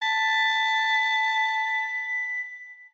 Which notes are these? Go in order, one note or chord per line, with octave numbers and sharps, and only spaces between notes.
A5 B6